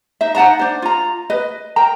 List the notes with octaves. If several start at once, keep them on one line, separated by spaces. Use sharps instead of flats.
D#4 E5
D#4 F#5 A5 A#5
D4 C5
F4 A#5
B4 D#5
A#4 G5 A#5